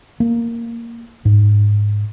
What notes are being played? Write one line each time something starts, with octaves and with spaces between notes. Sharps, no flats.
A#3
G#2